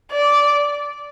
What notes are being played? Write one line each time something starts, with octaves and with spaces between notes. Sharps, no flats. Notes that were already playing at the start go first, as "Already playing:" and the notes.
D5